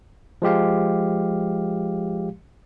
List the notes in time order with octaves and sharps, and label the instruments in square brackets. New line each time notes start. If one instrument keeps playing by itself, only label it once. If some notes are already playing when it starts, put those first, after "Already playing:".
[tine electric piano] F3 G#3 G4 F5